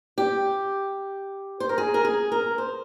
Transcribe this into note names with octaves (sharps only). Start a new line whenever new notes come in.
G4
C5
A#4
G#4
A#4
G#4
A#4
C5